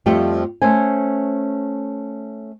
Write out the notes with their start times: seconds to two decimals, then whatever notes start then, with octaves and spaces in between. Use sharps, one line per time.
0.06 F2 F3 G3 A3 G4
0.62 A3 C#4 C5 G#5